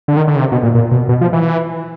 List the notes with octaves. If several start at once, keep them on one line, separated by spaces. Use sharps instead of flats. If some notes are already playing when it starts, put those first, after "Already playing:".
D3
D#3
D3
C#3
C3
B2
A#2
A#2
B2
B2
F3
E3